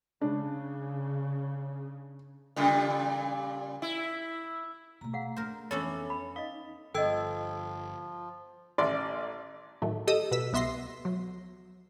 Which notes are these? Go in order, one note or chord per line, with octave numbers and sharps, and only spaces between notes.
C#3 D4
A#2 C#3 G3
E4
B2 A3 A#5
G#4 F5 F#5
A3 D4 A#4 C5
F2 E3 B3 C#4 D4 A4 C#5
B5
D#4 D#5 F5
G1 F3 A4 D#5 G5 E6 G#6
A1 D5 C6
A2 D#3 F#3 A3
G4 A4 D#5 D#6 E6
B2 B4 E6 B6
C2 B3 E5 C6 A#6 C7
F#3